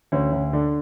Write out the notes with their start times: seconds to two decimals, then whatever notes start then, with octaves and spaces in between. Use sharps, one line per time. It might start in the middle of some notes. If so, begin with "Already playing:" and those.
0.12 D2 C#4
0.32 D2
0.53 D3 D4